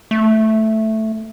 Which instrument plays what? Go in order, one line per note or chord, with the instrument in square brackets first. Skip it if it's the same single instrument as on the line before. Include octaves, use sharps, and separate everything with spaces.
[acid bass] A3